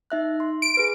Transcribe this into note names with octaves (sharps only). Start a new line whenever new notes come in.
D#4 E5 F#6
C6
D7
G#4 B4